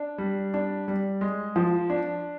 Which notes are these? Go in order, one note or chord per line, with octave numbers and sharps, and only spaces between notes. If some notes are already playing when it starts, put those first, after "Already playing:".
Already playing: D4
G3
D4
G3
G#3
F3
D4